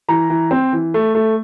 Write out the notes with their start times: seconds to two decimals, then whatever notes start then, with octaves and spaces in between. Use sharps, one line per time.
0.08 E3 A#5
0.30 E3
0.51 C4
0.73 E3
0.94 A3
1.15 A3